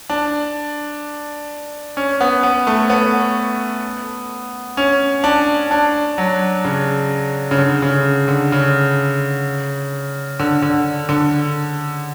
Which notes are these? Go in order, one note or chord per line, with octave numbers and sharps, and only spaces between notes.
D4
C#4
B3
B3
A3
B3
C#4
D4
D4
F#3
C#3
C#3
D3
C#3
D3
C#3
D3
D3
D3